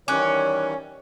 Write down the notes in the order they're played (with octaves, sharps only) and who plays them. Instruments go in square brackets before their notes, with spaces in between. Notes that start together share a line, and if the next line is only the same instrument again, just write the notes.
[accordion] D#3 E3 G3 [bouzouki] C#4 [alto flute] C#5 [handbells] D6 F#6